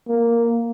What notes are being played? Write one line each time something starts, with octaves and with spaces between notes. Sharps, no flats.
A#3